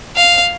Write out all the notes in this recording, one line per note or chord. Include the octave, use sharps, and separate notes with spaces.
F5